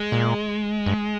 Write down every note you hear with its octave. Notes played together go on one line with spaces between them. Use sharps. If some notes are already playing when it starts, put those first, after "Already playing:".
Already playing: G#3
A#2
G2